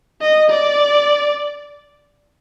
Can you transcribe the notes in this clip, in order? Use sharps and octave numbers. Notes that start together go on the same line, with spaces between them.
D#5
D5